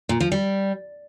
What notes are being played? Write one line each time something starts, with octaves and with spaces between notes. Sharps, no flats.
A#2
F3
G3